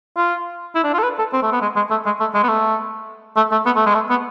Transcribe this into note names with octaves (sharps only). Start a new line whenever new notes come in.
F4
E4
D4
F4
A4
B4
A4
C4
A3
B3
G#3
G#3
A3
G#3
A3
G#3
B3
A3
A3
A3
B3
A3
G#3
A3
B3